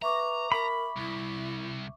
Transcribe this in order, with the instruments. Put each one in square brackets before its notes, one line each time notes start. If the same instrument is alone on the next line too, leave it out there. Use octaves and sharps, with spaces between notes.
[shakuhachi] B4 [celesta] E5 C#6 D6 [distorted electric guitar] A#5
[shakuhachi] A#4 [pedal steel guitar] B5
[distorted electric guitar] C2 [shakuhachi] E4